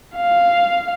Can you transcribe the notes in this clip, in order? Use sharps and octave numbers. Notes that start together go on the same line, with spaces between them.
F5